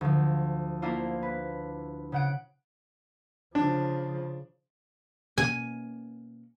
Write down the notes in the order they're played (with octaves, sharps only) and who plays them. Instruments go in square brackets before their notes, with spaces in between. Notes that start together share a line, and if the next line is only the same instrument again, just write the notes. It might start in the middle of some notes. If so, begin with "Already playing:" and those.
[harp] D2 F3
A#3 D4 E4 F4 C5
B4
C#3 F#5 D7
[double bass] C#3 F3 [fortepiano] D4
[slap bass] B2 A#3 C#4 [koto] G#5